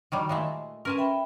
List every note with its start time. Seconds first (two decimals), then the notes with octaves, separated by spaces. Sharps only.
0.12 D#3 F#3 G3
0.29 A#2 G#3 A3
0.85 C#4 A#4 B4 G#5 A5 C6
0.98 E5 G5 B5